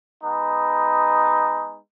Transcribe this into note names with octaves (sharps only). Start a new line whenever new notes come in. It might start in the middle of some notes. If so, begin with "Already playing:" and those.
G#3 B3 D#4